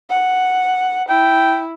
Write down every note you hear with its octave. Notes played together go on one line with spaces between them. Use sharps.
F#5
E4 G5